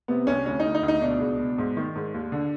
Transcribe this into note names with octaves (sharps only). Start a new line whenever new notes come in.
C3 B3
C2 C#4
D2 C#4
D#4
D2
D#4
D2
D#4
B2 D4
C#2
B2
G#2
D#3
G#2
D#2
D3